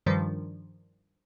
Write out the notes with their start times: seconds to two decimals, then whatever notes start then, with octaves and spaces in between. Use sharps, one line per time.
0.06 G2 D#3 F3 G3